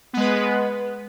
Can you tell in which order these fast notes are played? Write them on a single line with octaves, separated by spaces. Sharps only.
B3 G#3 B4